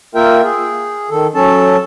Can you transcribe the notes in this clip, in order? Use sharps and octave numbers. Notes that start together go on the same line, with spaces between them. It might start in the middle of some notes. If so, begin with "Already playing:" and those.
A#3 F4 A#4 E5 G5
G#4
D#3 A4
F#3 C#4 A4 A5